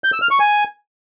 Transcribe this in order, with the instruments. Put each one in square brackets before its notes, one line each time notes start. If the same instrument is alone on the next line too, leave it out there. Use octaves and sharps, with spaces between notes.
[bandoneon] G6
E6
F6
C#6
G#5